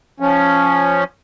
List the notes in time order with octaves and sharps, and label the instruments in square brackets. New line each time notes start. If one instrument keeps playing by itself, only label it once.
[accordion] F3 C#4